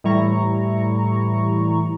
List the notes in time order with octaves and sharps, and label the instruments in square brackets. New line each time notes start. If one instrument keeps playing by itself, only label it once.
[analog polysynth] A2 E3 G3 E4 A#5 C#6